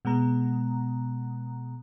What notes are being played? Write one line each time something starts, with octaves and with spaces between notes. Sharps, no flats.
B2 G#3 B3 A#5